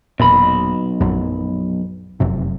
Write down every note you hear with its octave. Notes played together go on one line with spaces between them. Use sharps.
E1 B1 A#2 B5
A#1 F#2
F1 F#2 C3